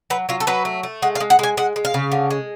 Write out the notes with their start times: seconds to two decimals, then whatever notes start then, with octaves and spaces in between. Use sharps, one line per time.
0.10 F#3 B4
0.29 F#3 F4
0.40 A4
0.47 F#3 B4
0.65 A3
0.83 A3
1.02 G#3 F#5
1.15 F5
1.20 G#3
1.30 F#5
1.39 G#3 G#5
1.57 G#3 F#5
1.76 G#3
1.85 F5
1.94 C#3
2.12 D3
2.31 G#3